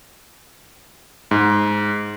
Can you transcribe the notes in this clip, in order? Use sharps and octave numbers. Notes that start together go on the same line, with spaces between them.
G#2